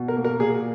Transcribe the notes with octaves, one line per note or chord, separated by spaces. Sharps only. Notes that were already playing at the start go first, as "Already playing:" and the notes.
Already playing: B2
A#4
A#3
A#4
A#2 G#4